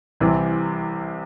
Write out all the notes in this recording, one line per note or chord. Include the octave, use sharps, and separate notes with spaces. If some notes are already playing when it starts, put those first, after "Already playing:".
C2 C3 E3